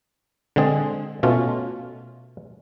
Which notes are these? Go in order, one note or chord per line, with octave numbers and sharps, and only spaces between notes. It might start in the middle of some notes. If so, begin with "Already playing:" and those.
D3 G#3 C4 G#4
B2 A3 C#4 F4